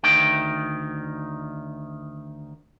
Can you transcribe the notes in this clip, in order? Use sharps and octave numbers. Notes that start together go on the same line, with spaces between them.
D2 D#3 G5